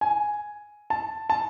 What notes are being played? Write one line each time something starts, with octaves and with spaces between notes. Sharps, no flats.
G#5
A5
A5